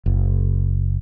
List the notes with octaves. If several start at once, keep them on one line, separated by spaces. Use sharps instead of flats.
F#1